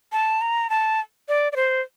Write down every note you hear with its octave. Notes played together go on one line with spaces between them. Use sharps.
A5
A#5
A5
D5
D5
C5